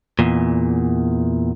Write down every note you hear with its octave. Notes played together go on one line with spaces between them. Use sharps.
E2 A#2